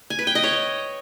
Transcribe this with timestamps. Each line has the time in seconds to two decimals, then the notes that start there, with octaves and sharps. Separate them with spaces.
0.10 G#5
0.19 B4
0.27 G5
0.35 D#5
0.44 C#5